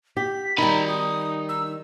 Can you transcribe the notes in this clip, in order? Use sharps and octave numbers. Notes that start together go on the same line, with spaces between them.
G4 B6
D#3 G3 D#4 A#5 B5
D#6
E6